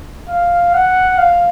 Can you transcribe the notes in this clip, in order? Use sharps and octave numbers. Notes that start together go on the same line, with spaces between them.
F5
F#5
F5